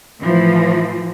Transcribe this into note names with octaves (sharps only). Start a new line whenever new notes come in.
A2 E3 F3